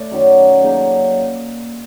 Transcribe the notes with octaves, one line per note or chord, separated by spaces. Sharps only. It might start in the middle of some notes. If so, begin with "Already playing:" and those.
Already playing: A3 D5
F#2 D#3 F#3
C#3 F#3 A#3 D#4